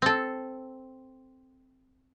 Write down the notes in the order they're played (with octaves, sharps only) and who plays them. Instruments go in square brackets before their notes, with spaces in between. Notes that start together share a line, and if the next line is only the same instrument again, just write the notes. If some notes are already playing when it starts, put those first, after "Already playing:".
[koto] C4 A4